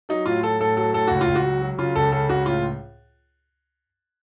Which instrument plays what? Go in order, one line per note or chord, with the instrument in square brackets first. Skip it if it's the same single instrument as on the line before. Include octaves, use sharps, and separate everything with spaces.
[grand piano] F#3 D#4
A2 F4
F#3 A4
A2 A4
F#3 A4
A2 A4
C#2 F#4
F4
C#2
F#4
F#3
F#3
C#3 F4
C#2 A4
C#3 A4
C#2 F#4
A2 F4